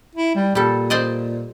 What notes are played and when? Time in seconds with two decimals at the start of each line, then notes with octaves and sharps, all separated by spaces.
0.15 E4
0.35 G3
0.55 A#2 G3 A4
0.90 C5 D5 D#5